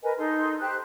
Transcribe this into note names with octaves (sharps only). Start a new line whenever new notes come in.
A#4 B4 D#5 G#5
D#4 A4 C6
G4 C5 F#6